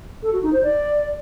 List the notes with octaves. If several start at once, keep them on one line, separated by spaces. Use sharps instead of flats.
A4
F#4
D#4
C5
D5